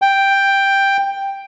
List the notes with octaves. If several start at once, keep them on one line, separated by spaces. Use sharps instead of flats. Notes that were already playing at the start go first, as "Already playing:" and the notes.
G5